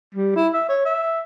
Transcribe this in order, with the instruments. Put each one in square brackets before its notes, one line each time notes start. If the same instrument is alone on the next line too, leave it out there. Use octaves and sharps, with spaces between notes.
[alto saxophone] G3
E4
E5
C#5
E5